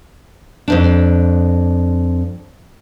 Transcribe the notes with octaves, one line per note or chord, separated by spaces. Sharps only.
F2 G#2 D4